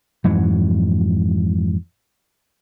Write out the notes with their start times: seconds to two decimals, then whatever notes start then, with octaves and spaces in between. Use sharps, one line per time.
0.24 F2 G#2 E3 F#3